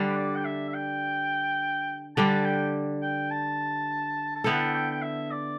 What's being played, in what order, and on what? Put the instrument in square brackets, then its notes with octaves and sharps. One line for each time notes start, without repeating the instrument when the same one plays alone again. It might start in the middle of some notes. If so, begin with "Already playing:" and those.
Already playing: [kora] D3 G3 D4
[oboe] B4
D5
G5
E5
E5
G5
[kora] D3 G3 D4 G4 [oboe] A5
[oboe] G5
G5
A5
A5
[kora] D3 B3 E4 A4 [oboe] G5
[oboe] G5
G5
E5
D5